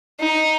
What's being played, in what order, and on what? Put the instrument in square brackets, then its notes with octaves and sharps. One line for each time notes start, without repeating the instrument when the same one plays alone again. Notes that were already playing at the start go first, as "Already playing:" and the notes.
[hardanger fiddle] D#4